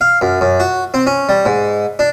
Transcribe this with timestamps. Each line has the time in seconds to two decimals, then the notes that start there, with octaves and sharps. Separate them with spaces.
0.01 F5
0.21 F#2
0.41 F#2
0.60 F#4
0.94 C4
1.07 C#4
1.29 G3
1.45 G#2
1.99 D4